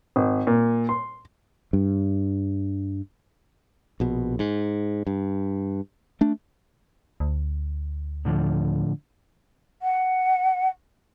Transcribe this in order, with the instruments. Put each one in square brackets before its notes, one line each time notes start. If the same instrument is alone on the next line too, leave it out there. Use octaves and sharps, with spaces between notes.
[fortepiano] G#1
A#2
C6
[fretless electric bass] G2
[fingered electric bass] A#1 B2
G#2
G2
A3 D4
[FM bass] D2
[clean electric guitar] A2 D3 F3
[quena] F#5